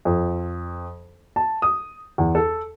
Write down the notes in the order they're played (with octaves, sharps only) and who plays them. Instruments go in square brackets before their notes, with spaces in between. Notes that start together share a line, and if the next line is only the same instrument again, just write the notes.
[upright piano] F2
A5
D#6
E2
A4